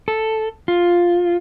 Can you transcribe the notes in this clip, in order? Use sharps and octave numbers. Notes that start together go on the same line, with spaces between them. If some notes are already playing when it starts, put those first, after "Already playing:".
A4
F4